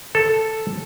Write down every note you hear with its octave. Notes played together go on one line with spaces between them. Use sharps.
A4